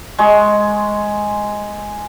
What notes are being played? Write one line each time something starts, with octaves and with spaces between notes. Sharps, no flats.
G#3 C#6